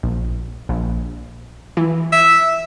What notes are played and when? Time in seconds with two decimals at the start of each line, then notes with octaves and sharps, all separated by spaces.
0.03 A#1
0.69 A#1
1.77 E3
2.12 E5